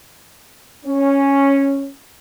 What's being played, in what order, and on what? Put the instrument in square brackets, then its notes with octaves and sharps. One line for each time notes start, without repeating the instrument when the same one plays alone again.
[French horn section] C#4